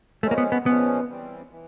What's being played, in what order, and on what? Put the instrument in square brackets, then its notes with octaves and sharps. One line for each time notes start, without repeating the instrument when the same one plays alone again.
[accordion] A#2 F3 G#3 C#4 [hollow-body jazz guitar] A3
[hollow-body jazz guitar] A#3
B3
B3
[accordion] A#2 F3 G#3 C#4 [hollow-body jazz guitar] B3
[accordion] E3 G3 C4
E3